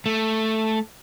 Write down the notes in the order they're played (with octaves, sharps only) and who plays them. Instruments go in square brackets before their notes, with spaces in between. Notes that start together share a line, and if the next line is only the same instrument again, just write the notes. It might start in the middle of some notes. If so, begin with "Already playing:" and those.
[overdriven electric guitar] A3